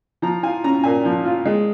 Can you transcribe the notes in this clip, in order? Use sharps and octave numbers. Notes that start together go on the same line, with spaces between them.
F3 A#5
F4 G#5
C#4 A#5
A#2 G#5
F3
F4
G#3